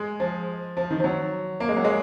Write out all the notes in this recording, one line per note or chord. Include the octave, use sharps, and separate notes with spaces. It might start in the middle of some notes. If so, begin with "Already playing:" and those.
Already playing: G#3
F3
F3
D#3
F3
F#3
A#3
G#3
F#3
G#3